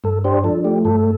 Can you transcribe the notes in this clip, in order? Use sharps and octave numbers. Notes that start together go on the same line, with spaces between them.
G2 A4
D4 G4 C5
F3 A4
A3 G4
G2 A4